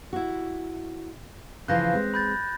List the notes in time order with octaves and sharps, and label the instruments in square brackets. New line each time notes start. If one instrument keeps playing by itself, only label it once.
[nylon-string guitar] E4 F#4
[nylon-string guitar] C#3 E3 F3 [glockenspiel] F#6 G6 A#6
[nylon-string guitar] G#3 C4
[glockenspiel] B5 G6 A6